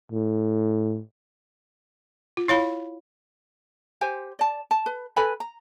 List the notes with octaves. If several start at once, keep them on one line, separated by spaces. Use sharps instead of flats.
A2
F4
E4 C#5 F5 B5
G4 C5 G#5
D5 A5
A5
B4
A4 B4 G#5 B5
A#5